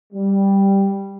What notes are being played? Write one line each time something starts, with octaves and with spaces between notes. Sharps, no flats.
G3